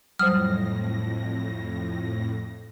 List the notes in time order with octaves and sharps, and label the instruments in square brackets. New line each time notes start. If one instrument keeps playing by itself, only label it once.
[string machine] F2 A2 A#6 [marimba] F#3 G3 C5 [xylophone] D#6 F6